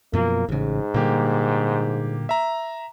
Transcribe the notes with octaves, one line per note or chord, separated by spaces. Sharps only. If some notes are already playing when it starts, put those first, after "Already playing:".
F#2 B2 F3 A#3
A1 G#2 C#3
A#2 D3 G3 A#3 G4
E5 A#5